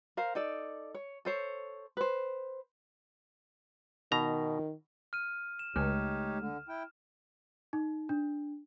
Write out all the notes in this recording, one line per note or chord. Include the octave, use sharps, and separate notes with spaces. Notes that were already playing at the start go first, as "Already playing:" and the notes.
A#4 C5 F5
D#4 A4 D5
C#5
A4 C5 C#5
B4 C5
B2 D#3 A#5
F6 D#7
E7
C#2 G#3 A3 D#4 G4 C#5 F6
D3
E4 G5
D#4
D4